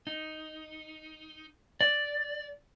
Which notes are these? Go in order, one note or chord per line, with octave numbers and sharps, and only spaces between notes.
D#4
D5